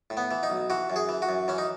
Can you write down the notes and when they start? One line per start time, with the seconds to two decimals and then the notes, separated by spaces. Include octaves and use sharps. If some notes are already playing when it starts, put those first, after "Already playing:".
0.10 A2
0.17 B3
0.31 E3
0.43 D#4
0.50 B1
0.70 E3 F#4
0.90 F#2
0.96 G#4
1.09 E3
1.22 F#4
1.29 F#2
1.48 E3 C#4
1.58 D#4